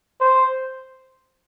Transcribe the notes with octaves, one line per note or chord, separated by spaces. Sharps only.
C5